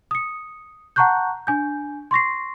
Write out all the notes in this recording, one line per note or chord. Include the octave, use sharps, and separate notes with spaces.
D#6 C#7
F#5 A5 A#5 C#6 F#6 G6
D4 G#5 G6
C6 C#6 A#6 C7